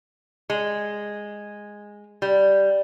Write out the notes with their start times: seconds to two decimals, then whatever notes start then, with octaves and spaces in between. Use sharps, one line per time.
0.50 G#3
2.22 G3